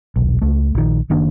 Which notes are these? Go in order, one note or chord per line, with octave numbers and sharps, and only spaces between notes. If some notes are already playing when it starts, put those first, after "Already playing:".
D#1 B1
C#2 A3
A#1 D#3
F#1 D#3 A#3 D4